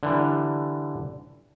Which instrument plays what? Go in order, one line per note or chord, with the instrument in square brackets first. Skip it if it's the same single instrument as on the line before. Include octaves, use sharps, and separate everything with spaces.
[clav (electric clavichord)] D3 E3 G3